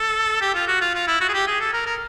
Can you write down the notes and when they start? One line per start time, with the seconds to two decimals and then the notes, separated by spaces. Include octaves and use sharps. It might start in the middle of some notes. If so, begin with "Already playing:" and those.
Already playing: A4
0.41 G4
0.54 F4
0.68 F#4
0.81 F4
0.95 F4
1.07 E4
1.21 F#4
1.29 G#4
1.34 G4
1.47 G#4
1.61 A4
1.73 A#4
1.86 A#4